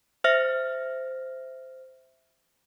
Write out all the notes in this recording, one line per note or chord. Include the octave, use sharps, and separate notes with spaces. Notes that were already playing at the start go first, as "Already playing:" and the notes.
C5 E5 F6 A#6